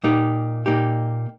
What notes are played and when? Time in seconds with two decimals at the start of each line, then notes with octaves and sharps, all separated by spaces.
0.04 A#2 A#3 D#4 G4
0.66 A#2 A#3 D#4 G4